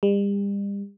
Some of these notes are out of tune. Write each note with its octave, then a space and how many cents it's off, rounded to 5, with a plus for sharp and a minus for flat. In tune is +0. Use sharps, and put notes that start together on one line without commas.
G3 +40